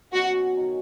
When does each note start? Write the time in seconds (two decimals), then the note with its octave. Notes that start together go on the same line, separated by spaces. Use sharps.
0.13 B2 F#3 C#4 F#4
0.56 F#2 D#3 F#3 C#4